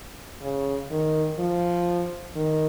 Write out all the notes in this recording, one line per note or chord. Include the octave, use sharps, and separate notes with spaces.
C#3
D#3
F3
D#3